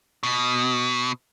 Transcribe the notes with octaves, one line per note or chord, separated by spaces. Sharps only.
B2